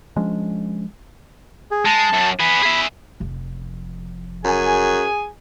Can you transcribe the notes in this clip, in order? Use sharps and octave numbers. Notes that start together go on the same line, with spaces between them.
F3 G#3 C#4 D4
G#4
G#3 A5
F#2
B3 G#4 B5
G#4 E5
F1 F3
F#2 G#4 G#5